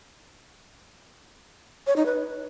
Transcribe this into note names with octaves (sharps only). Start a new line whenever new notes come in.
C#5
D#4
B4